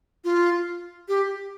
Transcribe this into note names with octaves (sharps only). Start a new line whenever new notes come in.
F4
G4